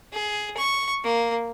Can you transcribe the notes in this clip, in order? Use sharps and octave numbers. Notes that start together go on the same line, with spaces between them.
G#4
C#6
A#3